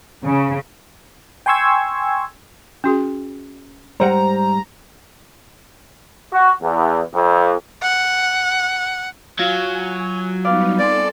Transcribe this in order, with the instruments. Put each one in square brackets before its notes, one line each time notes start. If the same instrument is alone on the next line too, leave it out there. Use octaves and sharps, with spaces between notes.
[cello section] C#3
[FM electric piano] G5 G#5 C6 C#6 E6 G#6
[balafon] C#4 F#4 G#4
[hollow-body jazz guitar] G#2 G3 F#5 [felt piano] C5 [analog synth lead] A#5
[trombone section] F#4
E2
F2
[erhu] F#5
[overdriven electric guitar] F#3 [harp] F4 [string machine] G#5
[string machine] G3 B3 D#4 [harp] B4 D5 F5
[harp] C4 G#5 C6 [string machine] A4 [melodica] D5